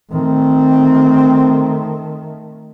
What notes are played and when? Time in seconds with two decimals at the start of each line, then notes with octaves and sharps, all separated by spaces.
0.11 D#3 A3 C4